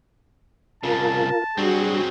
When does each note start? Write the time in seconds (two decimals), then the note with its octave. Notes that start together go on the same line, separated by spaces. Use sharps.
0.83 C2 C#3 F4 A#4 A5
1.58 F#3 G3 C4 D4 F#4 G#4